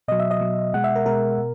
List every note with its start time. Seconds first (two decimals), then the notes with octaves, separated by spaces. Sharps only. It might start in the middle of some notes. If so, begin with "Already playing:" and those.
0.08 B2 F#3 D#5
0.20 E5
0.31 D#5
0.41 B2 F#3
0.74 B2 G#3 F#5
0.84 E5
0.96 A#4
1.06 B2 G#3 A#4
1.38 B2